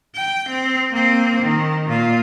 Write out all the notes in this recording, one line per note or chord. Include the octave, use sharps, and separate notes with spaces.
G5
C4
A#3 C4
D#3
A#2 F4